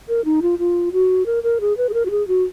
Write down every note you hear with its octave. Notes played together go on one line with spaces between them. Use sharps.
A#4
D#4
F4
F4
F#4
A#4
A#4
G#4
B4
G#4
A#4
F#4
G#4
F#4